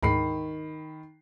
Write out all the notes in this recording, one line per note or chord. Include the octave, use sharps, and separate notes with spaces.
D2 G#2 D#3 B5 C7